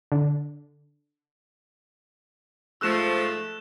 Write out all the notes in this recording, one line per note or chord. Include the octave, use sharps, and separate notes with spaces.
D3
G#2 F3 A3 E6 F#6 E7